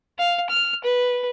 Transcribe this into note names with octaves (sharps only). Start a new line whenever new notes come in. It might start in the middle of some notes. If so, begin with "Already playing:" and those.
F5
F6
B4